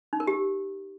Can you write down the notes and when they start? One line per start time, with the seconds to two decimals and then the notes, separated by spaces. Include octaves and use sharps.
0.13 D#4
0.20 A#4
0.27 G4